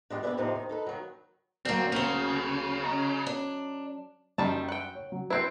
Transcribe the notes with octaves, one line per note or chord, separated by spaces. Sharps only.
E3 G3 G#3 D4
B3 D4 G#4 B4 D5 E5
F2 A2 C3 C4 D#4
D#3
D#4 A4 B4
D#3 E3 F#3
D2 F#3 A#3 C4 D4
C#3 A#3 C4
C#4 D#5 A#5
D4
F#2 D#3 G3 A5
F#5 G5
C#5
F#3
C4 E4 B4 F#6 G6